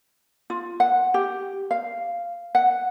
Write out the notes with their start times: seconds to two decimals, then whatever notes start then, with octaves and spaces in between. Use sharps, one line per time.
0.50 F4
0.80 F#5
1.14 G4
1.71 F5
2.55 F#5